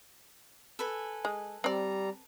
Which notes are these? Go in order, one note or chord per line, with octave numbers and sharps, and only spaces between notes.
A4 B4 G#5
G#3
G3 C4 D5 A#5